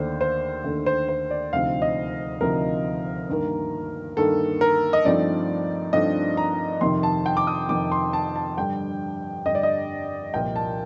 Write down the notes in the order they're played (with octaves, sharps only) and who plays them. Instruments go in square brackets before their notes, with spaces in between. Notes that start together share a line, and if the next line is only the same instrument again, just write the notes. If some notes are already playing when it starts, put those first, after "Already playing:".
Already playing: [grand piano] D#2 D3 A3 D4 C5
C5
D#2 D3 A3 D4
C5
C5
D5
D2 C3 F3 C4 D#4 F5
D#5
D2 C3 F3 C4 D#4 A#4
G2 D#3 A#3
G2 D#3 A#3 A4
A#4
D#5
G2 F3 A3 C4 D#4 D5
G2 F3 A3 C4 D#4 D#5
A#5
F2 C3 D#3 C6
A5
G5
D6
D#6
F2 C3 D#3 D6
C6
A5
A5
G2 D3 G3 G5
G2 D3 G3 D#5
D5
D#5
C2 A#2 F3 A#3 G5
A5